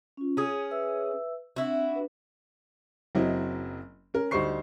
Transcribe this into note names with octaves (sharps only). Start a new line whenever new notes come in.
C#4 F4
C#4 G#4 D#6
B4 E5 E6
C4 D4 E4 F#4
D4 B4
F#1 F#3 C4 E4 D#5
C#4 A#4
D2 G3 D#4 C5 C#6 C7